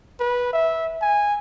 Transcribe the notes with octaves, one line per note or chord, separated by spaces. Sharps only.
B4
E5
G#5